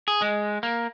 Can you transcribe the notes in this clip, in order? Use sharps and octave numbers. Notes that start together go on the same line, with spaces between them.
G#4
G#3
A#3